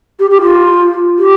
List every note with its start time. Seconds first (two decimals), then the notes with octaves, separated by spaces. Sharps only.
0.19 G4
0.30 G4
0.42 F4
1.18 G4